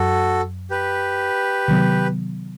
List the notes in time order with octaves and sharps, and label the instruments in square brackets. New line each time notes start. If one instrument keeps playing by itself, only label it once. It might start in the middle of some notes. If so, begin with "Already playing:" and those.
Already playing: [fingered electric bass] F#2 F#3 [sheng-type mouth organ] F#4 A4
[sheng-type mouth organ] G4 B4
[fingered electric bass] C3 D#3 F#3 B3